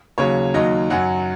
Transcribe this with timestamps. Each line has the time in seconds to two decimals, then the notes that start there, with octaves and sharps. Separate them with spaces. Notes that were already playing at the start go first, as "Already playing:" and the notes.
0.18 D#2 C#3 F#3 C#5
0.54 D#2 D#3 F#3 D#5
0.90 F#2 F#3 F#5